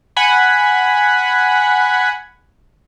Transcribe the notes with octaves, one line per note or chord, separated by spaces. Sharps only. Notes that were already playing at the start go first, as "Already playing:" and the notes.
F#5 G#5 B5